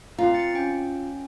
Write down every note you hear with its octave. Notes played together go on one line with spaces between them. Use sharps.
C4 F4 F5 A#5
A6 C#7
C#4 G5